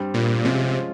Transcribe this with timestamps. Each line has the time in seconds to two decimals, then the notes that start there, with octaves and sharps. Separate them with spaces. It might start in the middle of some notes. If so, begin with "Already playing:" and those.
Already playing: G2 G3 C4
0.14 A#2
0.44 C3 F3 G#3 C#4 F4